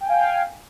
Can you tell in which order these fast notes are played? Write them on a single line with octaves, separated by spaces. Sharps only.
G5 G#5 F5